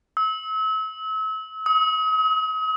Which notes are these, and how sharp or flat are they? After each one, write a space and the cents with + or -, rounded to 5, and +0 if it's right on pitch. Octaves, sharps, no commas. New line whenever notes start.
E6 -35
D#6 +40